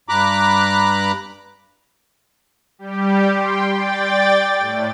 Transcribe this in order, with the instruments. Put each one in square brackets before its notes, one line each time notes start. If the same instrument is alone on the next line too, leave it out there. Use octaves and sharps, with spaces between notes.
[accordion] G2 A#5 B5 D6 F#6
[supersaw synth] G3 G4
G5 C6
D5 G5 A6
A2